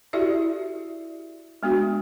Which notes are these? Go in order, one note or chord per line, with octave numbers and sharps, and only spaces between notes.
E4 F#4 G4 A4 D5 E5
G#3 B3 D4 F#4